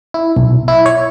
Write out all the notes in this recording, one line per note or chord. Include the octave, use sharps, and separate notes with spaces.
E4
B1
E4
C#5